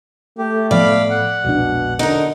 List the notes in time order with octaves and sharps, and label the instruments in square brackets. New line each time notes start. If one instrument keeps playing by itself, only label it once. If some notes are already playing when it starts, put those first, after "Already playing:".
[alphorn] A3 [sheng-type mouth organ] G4
[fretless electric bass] A2 F3 B3 [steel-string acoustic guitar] D5 [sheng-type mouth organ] F5 B5
[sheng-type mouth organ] F#5
[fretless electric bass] E1 A#1 D4 [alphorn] B2
[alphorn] D3 [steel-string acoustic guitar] D#4 A#4